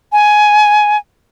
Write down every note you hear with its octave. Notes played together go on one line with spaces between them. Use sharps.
G#5